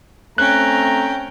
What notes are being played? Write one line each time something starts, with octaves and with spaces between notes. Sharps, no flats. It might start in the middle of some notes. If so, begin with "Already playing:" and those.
A3 C4 C#4 G5 A#5 F#6